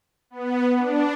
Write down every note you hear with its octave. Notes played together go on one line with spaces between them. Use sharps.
B3
D4